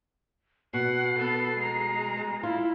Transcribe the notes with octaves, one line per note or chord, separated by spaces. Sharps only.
B2 F#5 C7
B3 A4
G#3 A#5
E4 F4